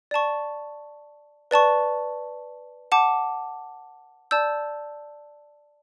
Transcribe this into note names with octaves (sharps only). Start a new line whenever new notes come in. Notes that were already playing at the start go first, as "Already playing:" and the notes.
D5 A5 C#6
B4 D5 A5 C#6
F#5 A5 D6
D5 A5 E6 G6